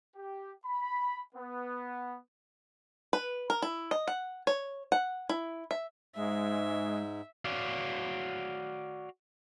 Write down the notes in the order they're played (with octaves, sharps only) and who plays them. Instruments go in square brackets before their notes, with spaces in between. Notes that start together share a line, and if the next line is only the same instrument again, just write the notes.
[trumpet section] G4
B5
B3
[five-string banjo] B4
A#4
E4
D#5
F#5
C#5
F#5
E4
E5
[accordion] G#2 [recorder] G#3 [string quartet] E5
[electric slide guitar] F#4 C#5 D5 F5